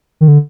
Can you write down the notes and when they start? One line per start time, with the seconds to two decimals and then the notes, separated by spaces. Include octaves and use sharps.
0.21 D#3
0.28 D3